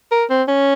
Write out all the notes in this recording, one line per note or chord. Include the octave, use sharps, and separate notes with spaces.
A#4
C4
C#4